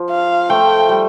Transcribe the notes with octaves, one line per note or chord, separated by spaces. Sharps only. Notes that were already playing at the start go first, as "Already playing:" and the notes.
Already playing: F3
F5
F3 A3 G5
G3